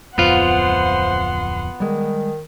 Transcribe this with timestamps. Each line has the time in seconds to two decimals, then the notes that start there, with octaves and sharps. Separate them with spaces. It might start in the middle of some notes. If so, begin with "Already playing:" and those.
0.18 D1 F2 B3 F4 C5 F#5 C6
1.80 D#3 G3 G#3